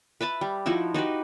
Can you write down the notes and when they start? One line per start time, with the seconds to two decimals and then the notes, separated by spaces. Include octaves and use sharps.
0.21 B4 E5 A5 B5
0.41 G3
0.66 F3 D#4 E4 F#4
0.94 D#4 F#4 G4 B4